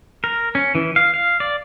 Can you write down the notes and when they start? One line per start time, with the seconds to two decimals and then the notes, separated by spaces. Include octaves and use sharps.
0.24 A#4
0.55 C#4
0.75 E3
0.96 F5
1.14 F5
1.40 D5